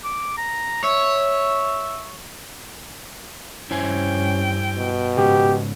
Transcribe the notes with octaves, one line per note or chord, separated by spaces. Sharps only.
D6
A#5
C#5 E5
G2 C#4 E4 C5 G5 G#5
B2
G#2 C#3 G4